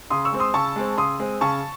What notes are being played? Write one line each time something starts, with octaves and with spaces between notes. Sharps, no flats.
C#3 C6 D#6
C#6 E6
G#3 C4
C6 D#6
C#3 A5 C#6
G#3 C4
C#3 C6 D#6
G#3 C4
C#3 A5 C#6